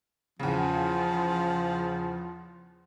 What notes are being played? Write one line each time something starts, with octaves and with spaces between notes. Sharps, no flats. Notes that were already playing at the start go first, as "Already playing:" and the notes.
E2 C#3 F3